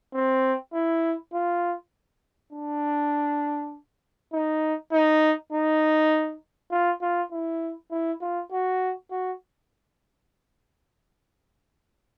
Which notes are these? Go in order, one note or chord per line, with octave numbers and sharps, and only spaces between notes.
C4
E4
F4
D4
D#4
D#4
D#4
F4
F4
E4
E4
F4
F#4
F#4